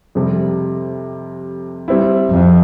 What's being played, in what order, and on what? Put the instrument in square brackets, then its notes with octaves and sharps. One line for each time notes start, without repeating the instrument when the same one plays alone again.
[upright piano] F2 C3 G3
G3 C4 E4
[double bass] F2